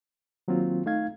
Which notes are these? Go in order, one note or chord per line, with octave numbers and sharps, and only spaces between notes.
D#3 F#3 A#3 C4 F4
A3 D#4 F5 G#6